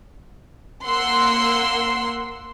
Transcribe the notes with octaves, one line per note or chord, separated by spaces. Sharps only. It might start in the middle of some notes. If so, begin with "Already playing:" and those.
A#3 F#5 C6 E6 C7